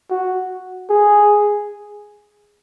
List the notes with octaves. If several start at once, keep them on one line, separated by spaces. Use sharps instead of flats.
F#4
G#4